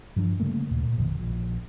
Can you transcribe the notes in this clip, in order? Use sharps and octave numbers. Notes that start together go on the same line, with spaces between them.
G2 E3 F3 D4
C#3 G3 A3 A#3
D#2 A#2
A#2
A#1 F#2 B2 D#3
A#1